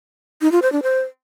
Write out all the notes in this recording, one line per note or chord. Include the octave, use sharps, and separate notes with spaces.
D#4
F4
C5
D4
C5